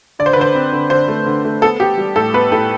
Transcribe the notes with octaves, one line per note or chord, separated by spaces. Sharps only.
D3 D5
C5
B4
D3 C5
C4
D3
D3 C5
A3
D3
A3
B3 A4
B3 G4
G3
A2 A4
B3 B4
A2 A4